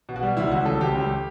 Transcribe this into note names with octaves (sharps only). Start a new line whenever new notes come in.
B2
F#4
G3
C#2 E4
C#2 F#4
C#2 A4
C#2 G4
C#2